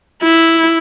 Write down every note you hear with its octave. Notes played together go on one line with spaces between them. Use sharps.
E4